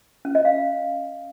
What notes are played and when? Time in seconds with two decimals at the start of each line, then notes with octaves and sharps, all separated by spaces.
0.25 C#4
0.35 D#5
0.45 F5